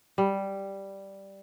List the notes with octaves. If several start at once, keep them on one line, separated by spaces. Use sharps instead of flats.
G3